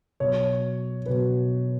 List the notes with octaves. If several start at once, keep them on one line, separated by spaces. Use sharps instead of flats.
B2 F#3 C#5
B2 F#3 B4